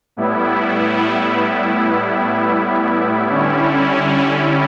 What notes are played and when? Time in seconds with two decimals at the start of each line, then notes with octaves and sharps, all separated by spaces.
0.17 A2 G3 B3 E4
3.29 D3 G3 C#4 E4